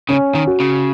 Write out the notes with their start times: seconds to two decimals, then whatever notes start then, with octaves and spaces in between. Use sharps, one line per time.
0.09 C#3 C#4
0.35 D#3
0.47 F#4
0.60 C#3